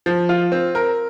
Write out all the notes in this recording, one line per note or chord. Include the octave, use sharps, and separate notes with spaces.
F3
F4
C4
A#4